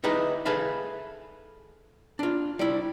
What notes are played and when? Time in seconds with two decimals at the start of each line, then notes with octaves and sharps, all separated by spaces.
0.04 D#4 E4 G4 G#4 B4 D#5
0.45 G#4 A4 B4 E5 F5
2.19 D4 F4
2.59 G3 E4